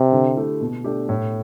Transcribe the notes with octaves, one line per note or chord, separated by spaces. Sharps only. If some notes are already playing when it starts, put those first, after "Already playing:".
Already playing: C3
D3
A3 E4 G4
B2
A3 D4 G4
A2